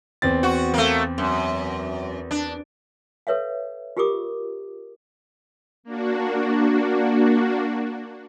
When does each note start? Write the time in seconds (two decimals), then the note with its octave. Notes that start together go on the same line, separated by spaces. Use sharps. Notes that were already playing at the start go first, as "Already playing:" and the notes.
0.22 E2 C4 A6
0.43 F#4
0.74 A3 A#3
1.18 F#2
2.31 D4
3.27 A4 B4 C#5 E5 F5
3.97 F4 G4 G#4 A#4 D6 D#6
5.84 A#3 D4 F#4